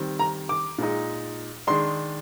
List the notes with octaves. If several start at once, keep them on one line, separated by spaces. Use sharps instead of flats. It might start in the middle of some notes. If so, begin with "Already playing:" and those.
Already playing: D#3 G3 C4
A#5
D6
A#2 G#3 D#4
D#3 G#3 D4 C6